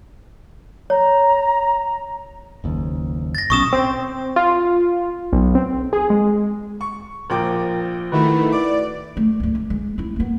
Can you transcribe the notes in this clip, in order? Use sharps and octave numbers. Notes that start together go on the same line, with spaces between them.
C#5 A#5
F#1 D#2
A6 A#6
B1 B2 C#4 C#6 D#6 E7
C4
F4
B1
C4
G#4
G#3
C#6
A#1 F3 A#4 G5 D6
D#3 A3 E4 F#4 B4
D5 D6
A3
D2 G2
G#3
G#3
C4 E4
A#3 B3